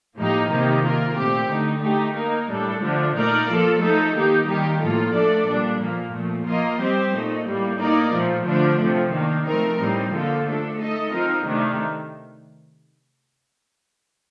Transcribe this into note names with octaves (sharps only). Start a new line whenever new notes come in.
A2 F3 A#3 D#4 G4
C3 D#3 A#3 D#4 G4
A#3 F4 A#4
A#2 A3 C4 G4
D3 A3 D#4
A3 D#4 G4
A#3 D#4 A#4
A2 G3 D4 A4
D3 F3 A3 D4
A#2 A3 D#4 A#4 D5
F3 A#3 F4 A4
F3 A3 D#4 A4
D#3 A#3 D#4 G4
D#3 G3 A#3 D#4 G4
A2 F3 A#3 F4 A4
F3 A3 D4 A4 D5
A#2 G3 D4
A#2 F3 A#3
A#2 F3 A3
F3 A#3 F4 A#4 D#5
G3 C4 G4 C5
A#2 A3 D#4
A2 G3 A#3
A#3 D#4 A#4 D5
A#2 F3 A3
D3 F3 A3 D4
C3 F3 A3
D#3 A#3 D4
F3 A3 C4 D#4 A#4
A2 G3 C4 D#4
D3 F3 A#3 F4 A4
A3 D4 A4
A3 D#4 A4 D#5
F3 C4 D#4 A#4
C3 D#3 A3 D4